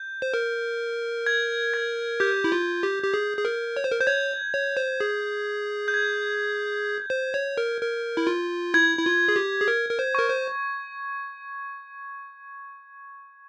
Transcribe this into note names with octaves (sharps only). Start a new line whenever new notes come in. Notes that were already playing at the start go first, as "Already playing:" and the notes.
Already playing: G6
C5
A#4
G#6
G#6
G4 G6
E4
F4
G4
G4
G#4
G#4
A#4
C#5
C5
A#4
C5 G6
C#5 G#6
C#5
C5
G#4
G6
G#6
C5
C#5
A#4
A#4
E4
F4
E4 G#6
E4
F4
G#4
G4
G#4
A#4
A#4
C5
A#4 C#6
C5